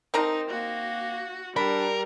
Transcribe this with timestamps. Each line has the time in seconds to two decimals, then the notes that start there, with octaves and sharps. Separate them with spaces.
0.14 C4 D#4 A#4 A#5
0.50 A#3 F#4
1.56 G3 D4 A#4 B5